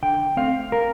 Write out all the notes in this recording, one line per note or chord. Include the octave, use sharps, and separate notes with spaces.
D3 G5
A3 C4 F5
A#4